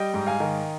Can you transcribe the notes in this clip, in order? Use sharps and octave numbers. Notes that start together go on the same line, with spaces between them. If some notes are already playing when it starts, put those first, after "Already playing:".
Already playing: G3 D#5 G5
G#2
F5 G#5
D#3